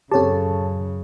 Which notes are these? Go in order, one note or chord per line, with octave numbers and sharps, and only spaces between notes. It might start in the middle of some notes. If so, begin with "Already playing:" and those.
F#2 C#3 C4 G4 A4 C#5 A5